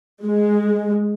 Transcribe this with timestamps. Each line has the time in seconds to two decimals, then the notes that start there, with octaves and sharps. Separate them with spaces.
0.25 G#3